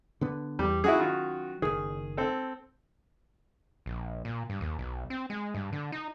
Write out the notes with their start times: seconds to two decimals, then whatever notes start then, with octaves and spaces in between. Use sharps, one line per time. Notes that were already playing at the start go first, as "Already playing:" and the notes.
0.21 D3 B3
0.59 E2 G3
0.84 F#3 C#4 E4 F#4 G#4
0.99 D#3 F4 F#4
1.62 F#1 C2 D#3 G#4
2.17 C4 A4
3.86 A#1
4.25 A#2
4.50 G2
4.61 D#2
4.79 B1
5.10 C4
5.30 G#3
5.54 G2
5.72 D3
5.92 D#4